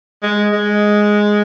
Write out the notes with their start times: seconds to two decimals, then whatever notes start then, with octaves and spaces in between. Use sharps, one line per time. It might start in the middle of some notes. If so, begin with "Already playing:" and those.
0.23 G#3
0.52 G#3